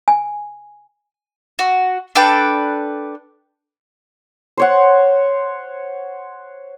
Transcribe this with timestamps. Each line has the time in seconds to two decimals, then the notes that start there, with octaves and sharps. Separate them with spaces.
0.08 G#5
1.59 F#4
2.15 D4 A4 B4 G5
4.57 C5 C#5 F#5